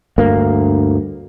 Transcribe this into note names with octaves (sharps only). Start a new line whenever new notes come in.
D2 G2 A#3